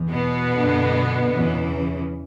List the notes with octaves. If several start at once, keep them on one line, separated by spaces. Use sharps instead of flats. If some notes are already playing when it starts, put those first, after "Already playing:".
Already playing: E2
B2 B3
F#2 D3
E2 C#3 E3